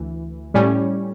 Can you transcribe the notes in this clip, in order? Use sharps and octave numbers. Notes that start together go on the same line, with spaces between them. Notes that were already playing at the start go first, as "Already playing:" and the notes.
Already playing: D2 E3
A2 G3 C#4